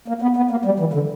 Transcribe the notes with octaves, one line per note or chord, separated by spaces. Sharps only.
A#3
B3
B3
A#3
G3
E3
D3